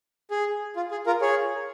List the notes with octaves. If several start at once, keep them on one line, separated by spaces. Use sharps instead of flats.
G#4
F4
G#4
F4 A#4
G#4 C#5